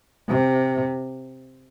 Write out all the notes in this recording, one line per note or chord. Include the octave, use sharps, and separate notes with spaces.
C3